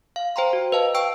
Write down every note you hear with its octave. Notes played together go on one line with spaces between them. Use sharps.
F5
C5 G5 A#5 C6
F#4
B4 D#5 F5 A5
G5 C#6 E6 D7